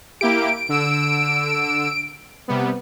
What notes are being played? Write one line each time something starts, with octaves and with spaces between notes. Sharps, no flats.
A#3 E4 G4 D7
D3 E6
C3 G3 B3